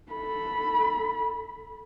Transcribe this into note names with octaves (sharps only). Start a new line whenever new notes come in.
A4 B5